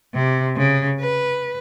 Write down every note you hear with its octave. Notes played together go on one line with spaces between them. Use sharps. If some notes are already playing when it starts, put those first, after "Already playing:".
C3
C#3
B4